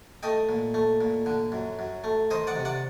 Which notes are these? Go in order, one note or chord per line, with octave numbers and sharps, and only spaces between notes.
A3 D#5 G5
A#2
A3
A#2
D3
F#2
F#2
A3
D#3 C5 D#5
D5 F#5
C3
D5 F#5